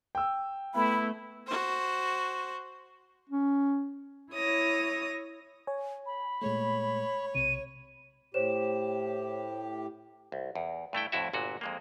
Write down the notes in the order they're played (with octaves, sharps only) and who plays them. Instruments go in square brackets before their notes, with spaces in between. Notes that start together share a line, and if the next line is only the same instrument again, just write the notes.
[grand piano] G5 E6
[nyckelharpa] A3 B3 [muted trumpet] E4 [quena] B5
[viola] F#4 C5
[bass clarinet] C#4
[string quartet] E4 C#5 D#6 A#6
[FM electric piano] C#5 G#5
[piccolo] B5
[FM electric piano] A#2 G#3 A3 [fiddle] C#5
[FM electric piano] B1 C3 [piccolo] D#7
[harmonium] A2 G4 [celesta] C5 C#5 E7
[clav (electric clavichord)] C2
E2
G2 A3 E4 G5
F2 A2 E4 F#4 E5
G1 A#2 F#4
F2 G#3 A#3